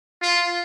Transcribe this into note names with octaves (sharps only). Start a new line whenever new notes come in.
F4